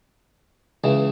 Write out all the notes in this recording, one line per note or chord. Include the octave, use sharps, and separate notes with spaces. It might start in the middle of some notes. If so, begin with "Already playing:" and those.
C#2 C#3 E3